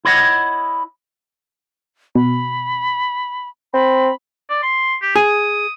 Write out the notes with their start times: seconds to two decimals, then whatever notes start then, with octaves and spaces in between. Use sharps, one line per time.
0.05 E4 C#5 D#5 F#5
2.15 B2 B5
3.73 C4 B5
4.49 D5
4.63 C6
5.01 G4
5.16 G#4 D#6